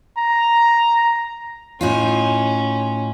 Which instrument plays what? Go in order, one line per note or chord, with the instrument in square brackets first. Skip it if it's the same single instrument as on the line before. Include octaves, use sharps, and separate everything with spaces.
[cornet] A#5
[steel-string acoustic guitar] A2 D#4 F4 [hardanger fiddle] C#4